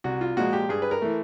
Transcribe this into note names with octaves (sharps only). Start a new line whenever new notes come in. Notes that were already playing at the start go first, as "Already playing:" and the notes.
C2 F#4
F4
A#2 F3 G#3 F#4
G4
G2 G#4
B4
A#4
E3 A3